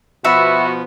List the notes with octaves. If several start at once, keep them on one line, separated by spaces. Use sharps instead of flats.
B2 F3 B3 F#4 E5 B5